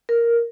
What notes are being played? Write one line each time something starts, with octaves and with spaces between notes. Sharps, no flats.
A#4